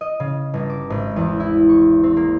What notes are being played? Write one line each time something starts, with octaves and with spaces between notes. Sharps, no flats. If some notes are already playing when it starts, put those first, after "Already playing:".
D#5
C#3
G1
D6
G#1
E2
E4
C#6
C4
A#3